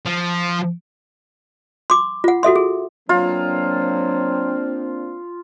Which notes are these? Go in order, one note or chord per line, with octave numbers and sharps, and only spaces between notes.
F3
C6 D6
F4 F#5
F#4 A4 E5 C6
G#4
F#3 A#3 C4 D4 F4